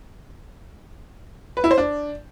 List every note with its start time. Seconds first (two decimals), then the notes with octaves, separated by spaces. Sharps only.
1.57 B4
1.64 E4
1.71 C5
1.78 D4